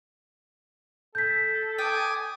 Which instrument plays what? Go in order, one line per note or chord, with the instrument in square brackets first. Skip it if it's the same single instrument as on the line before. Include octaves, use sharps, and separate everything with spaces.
[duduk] A4 [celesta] G6 B6
[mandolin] G5 [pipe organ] G#5 D6 D#6